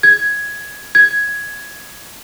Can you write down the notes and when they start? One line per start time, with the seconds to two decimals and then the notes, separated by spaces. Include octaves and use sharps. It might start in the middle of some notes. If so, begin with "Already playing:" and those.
0.03 G#6
0.95 G#6